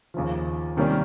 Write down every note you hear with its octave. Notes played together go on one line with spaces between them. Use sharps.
D#2 C#3 F3
C3 D#3 G3 A#3 C#4